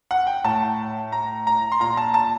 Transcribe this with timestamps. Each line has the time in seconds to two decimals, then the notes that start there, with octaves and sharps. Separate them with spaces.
0.11 F#5
0.27 G5
0.44 A2 A5
1.12 A#5
1.47 A#5
1.72 C6
1.80 A#2 A#5
1.97 A5
2.14 A5